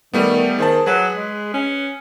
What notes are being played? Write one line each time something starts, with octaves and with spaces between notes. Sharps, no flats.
D#3 G3 A3 B3
D#3 G#4 C5 A5
F#3 G#4 B4
G#3
C#4